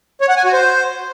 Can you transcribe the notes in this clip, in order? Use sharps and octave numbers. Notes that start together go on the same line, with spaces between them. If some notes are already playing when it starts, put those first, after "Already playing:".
C#5
F#5
G#5
F#4
C5